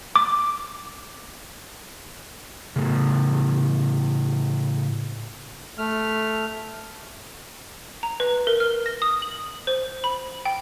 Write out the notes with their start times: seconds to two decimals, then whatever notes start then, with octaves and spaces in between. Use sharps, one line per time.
0.16 D6
2.76 A2 C#3
5.78 A3 F6
8.03 A#5
8.20 B4
8.47 A#4
8.60 F6
8.86 A#6
9.02 D#6
9.22 F#7
9.67 C5
10.04 B5
10.45 G5